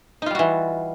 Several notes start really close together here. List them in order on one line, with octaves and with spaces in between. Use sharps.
D#4 F4 G3 F#4 E3